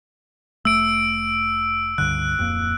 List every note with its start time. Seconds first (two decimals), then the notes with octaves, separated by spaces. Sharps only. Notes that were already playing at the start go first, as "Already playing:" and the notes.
0.65 F1 A3 E6 D7
1.98 C#2 G2 D3 F#6
2.37 D1 F2 A#3